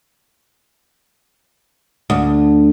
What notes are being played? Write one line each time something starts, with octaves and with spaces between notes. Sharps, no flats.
D2